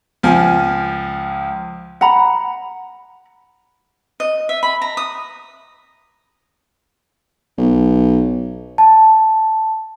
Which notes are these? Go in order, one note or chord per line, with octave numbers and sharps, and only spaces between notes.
C#2 F3 G#5
F#5 A#5 B5
D#5
E5
B5
A#5
D#6
B1
A5